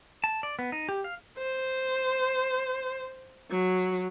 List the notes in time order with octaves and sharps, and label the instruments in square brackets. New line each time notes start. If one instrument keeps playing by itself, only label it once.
[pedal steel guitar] A5
D5
B3
D#4
G4
F5
[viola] C5
F#3